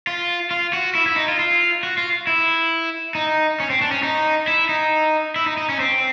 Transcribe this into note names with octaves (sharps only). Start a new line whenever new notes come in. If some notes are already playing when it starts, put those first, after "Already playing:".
F4
F4
F#4
E4
E4
D#4
F4
F4
F#4
F4
E4
D#4
C#4
C4
D4
C#4
D#4
E4
D#4
E4
D#4
D#4
C#4
C4